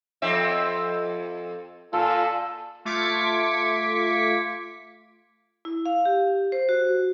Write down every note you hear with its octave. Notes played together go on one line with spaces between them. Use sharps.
F2 C4 E5
A#2 F4 A4
A3 F4 D6 G#6 B6 C#7
E4
F5
G4
C5
F#4